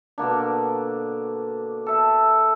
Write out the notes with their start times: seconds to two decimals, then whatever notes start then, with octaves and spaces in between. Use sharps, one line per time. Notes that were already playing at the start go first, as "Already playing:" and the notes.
0.18 B2 D3 A#3 D4
1.86 A4 E5